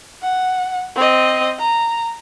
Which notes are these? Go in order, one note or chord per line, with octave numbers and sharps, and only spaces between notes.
F#5
C4 D#5
A#5